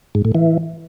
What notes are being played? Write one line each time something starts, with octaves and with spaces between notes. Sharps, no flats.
G#2
A2
E3